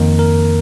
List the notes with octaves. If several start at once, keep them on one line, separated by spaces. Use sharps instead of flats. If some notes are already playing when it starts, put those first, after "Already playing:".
Already playing: F2 D#3 A#3 A#4
A#4